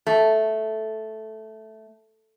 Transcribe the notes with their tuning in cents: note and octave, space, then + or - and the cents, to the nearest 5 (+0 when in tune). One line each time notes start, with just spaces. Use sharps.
A3 -5